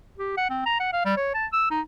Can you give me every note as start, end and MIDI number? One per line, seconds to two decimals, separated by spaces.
0.18 0.34 67
0.37 0.49 78
0.50 0.62 60
0.66 0.77 82
0.80 0.91 78
0.93 1.02 77
1.05 1.16 55
1.17 1.30 73
1.34 1.46 81
1.53 1.66 88
1.71 1.81 63